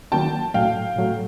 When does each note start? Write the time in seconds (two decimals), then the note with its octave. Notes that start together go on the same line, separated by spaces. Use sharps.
0.12 D#3 F#3 A#3 C#4 F#4 G5 A5
0.54 A2 F#3 A3 F5 G5
0.96 A2 F#3 A3